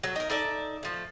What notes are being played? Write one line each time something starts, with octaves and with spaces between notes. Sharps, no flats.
F#3 A4
D#4 A#4
D#4 A4 D5 E5
F3 A3